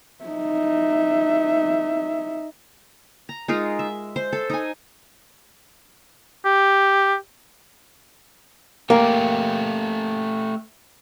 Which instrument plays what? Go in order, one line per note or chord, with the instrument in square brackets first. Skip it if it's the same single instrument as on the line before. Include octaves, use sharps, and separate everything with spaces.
[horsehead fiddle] D#4 E5
[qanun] A#5
G#3 D#4 F4 A#4
E5
C5
A4
D#4 G#5
[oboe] G4
[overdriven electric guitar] A3 G4 [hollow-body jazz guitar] A#3